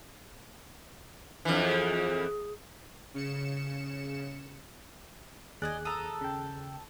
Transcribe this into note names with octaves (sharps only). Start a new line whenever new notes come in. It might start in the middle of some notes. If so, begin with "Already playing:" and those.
F2 E3 D4
G#4
C#3 C#7 E7
D#2 G#4 D5 D#5 G#5 F#6
A4 A#5 D#6 E6
C#3 G5